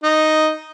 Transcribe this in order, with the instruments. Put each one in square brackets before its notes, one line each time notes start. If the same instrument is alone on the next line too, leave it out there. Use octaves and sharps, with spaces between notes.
[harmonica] D#4